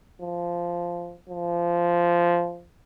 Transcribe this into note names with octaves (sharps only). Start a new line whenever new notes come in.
F3
F3